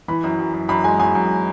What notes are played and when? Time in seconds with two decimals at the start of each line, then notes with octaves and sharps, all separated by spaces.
0.08 E3 B5
0.24 F#2
0.38 F#2
0.54 F#2
0.69 F#2 B5
0.84 G#3 G#5
0.99 F#2 G#5
1.15 F#2